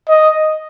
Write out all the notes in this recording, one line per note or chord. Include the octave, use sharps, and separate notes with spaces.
D#5